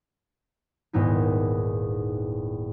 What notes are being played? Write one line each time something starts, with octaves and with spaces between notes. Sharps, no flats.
D#1 G#2 B3 D#4 E4